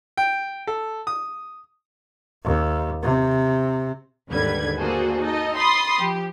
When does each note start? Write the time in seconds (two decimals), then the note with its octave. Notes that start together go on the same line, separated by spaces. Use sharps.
0.17 G5
0.67 A4
1.07 D#6
2.44 D#2
3.02 C3
4.29 D#2 G#2 D3 G3 B4 G#6
4.77 A#3 D4 F#4 G#4 A4 C5
5.20 D#4 A4 D#5
5.55 B5 C6 D#6 A6
5.98 F3 G4